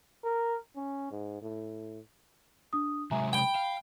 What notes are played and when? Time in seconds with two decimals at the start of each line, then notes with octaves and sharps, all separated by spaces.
0.24 A#4
0.76 C#4
1.11 G#2
1.41 A2
2.73 D4 D#6
3.11 C3 F#3 G#3 E5 G#5 A#5
3.33 G5 B5
3.55 F5